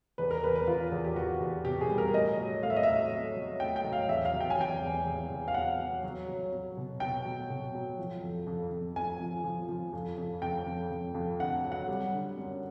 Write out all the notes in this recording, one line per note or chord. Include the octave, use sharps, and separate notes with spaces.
E2 B4
A#4
E2 B4
B4
E2 F4
E2
G4
E2 F#4
E2
B2 G4
G#4
G3
A#4
A2 D#5
F#3
A2 F5
E5
D#5
F#3 E5
F#3
F#3
A2 G5
G5
F#3
F5
E2 E5
F5
F#3
G5
G#5
E2 G5
E2
E2
E2
F5
F#3 F#5
F#3
F#3
F#3
F#3
B2
B2 G5
F#3
B2
F#3
F3
F2
F2
F2
F2 G#5
F3
F3
F3
F2
F2
F2 G5
F2
F2
F2
D3 F#5
F#3
F#5
G3
D3
F#2